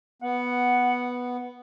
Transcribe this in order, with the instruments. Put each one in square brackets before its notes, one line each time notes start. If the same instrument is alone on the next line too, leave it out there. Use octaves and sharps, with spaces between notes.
[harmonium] B3 [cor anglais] F#5